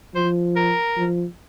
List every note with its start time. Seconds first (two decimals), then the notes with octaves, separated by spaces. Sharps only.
0.15 F3 C5
0.56 A#4
0.97 F3